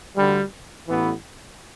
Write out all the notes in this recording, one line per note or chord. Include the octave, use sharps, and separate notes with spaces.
D2 D3 G3
A1 A2 E3 B3